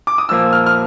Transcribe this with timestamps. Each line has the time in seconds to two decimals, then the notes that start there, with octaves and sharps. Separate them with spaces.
0.07 D6
0.18 D#6
0.29 A#2 F3 A#3 E6
0.53 F6
0.66 F6